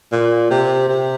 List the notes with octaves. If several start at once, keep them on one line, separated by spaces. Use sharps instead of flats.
A#2
C3
C3